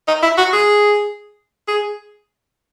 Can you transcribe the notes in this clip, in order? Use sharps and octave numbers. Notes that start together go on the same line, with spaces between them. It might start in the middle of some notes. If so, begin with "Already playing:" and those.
D#4
E4
F#4
G#4
G#4